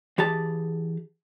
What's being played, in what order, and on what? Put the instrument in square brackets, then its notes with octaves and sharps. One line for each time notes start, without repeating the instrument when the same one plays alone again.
[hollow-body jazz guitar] E3 G4 G#4 A5